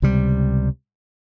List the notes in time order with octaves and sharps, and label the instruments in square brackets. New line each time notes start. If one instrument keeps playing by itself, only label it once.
[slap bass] C#2 C3 G3